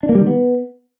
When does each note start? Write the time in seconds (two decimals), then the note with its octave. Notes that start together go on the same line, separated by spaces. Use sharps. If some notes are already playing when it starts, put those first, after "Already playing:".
0.03 D4
0.09 A#3
0.15 G3
0.21 D#3
0.27 B3